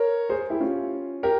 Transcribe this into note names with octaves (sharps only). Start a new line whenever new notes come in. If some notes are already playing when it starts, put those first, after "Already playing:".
Already playing: A#4 C#5
G#4 C5
E4 G4
C#4 F4
G4 A#4